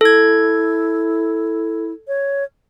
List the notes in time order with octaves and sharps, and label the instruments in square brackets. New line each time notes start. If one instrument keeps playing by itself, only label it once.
[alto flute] E4 [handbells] A4 G#6
[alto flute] C#5